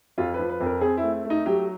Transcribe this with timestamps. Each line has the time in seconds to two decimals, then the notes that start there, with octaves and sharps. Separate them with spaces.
0.18 F2 F4
0.34 B4
0.40 F3
0.50 B4
0.60 F2
0.66 A#4
0.81 C4 G#4
0.97 E4
1.03 A3
1.25 A3
1.30 D#4
1.46 F#3 G4